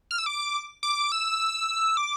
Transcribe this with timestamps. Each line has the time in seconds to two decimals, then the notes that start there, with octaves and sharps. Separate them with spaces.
0.11 F6
0.18 E6
0.26 D6
0.83 D6
1.12 E6
1.97 D6